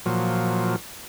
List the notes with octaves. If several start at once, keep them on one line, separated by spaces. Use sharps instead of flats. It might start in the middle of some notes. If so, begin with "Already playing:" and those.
A#2 F3 F#3